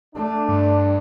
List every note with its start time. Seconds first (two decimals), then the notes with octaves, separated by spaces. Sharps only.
0.15 A3 D4
0.49 G2